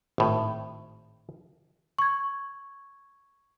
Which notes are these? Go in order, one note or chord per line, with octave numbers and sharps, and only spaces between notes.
G#1 A2
C#6 G#6